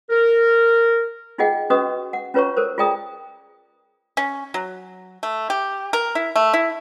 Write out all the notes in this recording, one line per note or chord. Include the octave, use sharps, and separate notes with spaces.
A#4
D#4 F4 G#4 D#5 F#5 G5
C#4 F#4 B4 D#5 C#6 D#6
F#5
C#4 F4 B4 C#5 A#5 C#6
A4 A#4 C5
F4 G#4 D5 G5 A#5 D#6
C#4
F#3
A3
G4
A#4
E4
A3
E4